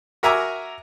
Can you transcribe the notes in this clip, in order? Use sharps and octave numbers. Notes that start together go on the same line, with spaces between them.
F#4 A#4 E5 G#5 A#5 D6